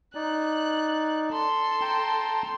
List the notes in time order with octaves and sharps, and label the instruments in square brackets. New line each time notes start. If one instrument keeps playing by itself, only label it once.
[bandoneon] D#4 D5 [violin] F#6
[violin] A4 C6
[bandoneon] G5 A5 A#5